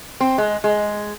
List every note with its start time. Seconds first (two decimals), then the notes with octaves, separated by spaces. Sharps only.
0.21 C4
0.38 G#3
0.64 G#3